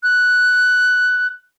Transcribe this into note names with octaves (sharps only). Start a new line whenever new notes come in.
F#6